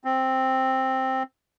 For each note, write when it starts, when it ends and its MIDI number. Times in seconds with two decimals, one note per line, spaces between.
0.05 1.23 60